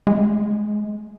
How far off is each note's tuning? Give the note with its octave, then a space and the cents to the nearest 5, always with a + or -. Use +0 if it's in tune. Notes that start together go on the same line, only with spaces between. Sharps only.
G#3 +20